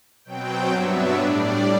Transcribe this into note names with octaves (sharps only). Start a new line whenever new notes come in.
B2 F#3 C4 G5
G2 F#3 B3 D4 E5
A2 G3 D4 D5